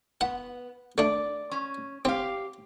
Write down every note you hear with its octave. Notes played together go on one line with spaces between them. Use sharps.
B3 F#5
A3 D4 D5
C#4
C4 G4 F5